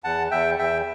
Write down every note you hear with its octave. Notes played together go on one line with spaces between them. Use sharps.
E2 F#5 A5
E2 E5 G5
E2 E5 G5